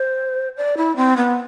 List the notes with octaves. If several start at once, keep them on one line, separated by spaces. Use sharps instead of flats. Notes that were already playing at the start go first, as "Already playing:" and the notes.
Already playing: C5
D5
E4
C4
B3